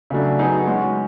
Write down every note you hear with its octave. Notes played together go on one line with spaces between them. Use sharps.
C#3 F#3 A3 D4
F#3 B3 D#4 G#4
G#3 C#4 F#4